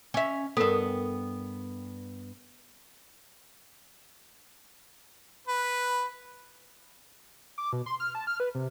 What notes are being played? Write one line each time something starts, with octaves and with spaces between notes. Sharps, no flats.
C#4 E5
G2 B3 A4 A#4
B4
D6
B2
C6
F6
A5
F6
B4
C3